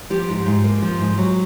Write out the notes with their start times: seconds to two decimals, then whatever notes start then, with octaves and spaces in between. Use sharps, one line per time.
0.10 F3 G4
0.29 G#2
0.46 G#2
0.64 A#3
0.82 F3
1.00 G#2
1.18 F#3